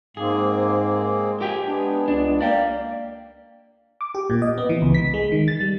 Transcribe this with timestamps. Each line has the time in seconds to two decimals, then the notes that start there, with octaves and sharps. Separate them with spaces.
0.17 G#2 G#3 A#3 C4 G#4
1.41 G4 G5 G#5
1.65 G#3 B3 D4
2.08 C#2 D4
2.41 A#3 D5 G5
4.01 D6
4.15 G4
4.30 A#2
4.42 D#5
4.58 B3
4.69 E3
4.82 C#2
4.94 B6
5.14 G#3
5.32 D#3
5.48 A6
5.60 G3